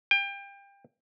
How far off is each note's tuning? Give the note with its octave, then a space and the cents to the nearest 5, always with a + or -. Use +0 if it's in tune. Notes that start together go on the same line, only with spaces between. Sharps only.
G5 +30